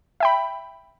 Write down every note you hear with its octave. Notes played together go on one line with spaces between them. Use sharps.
E5 G5 B5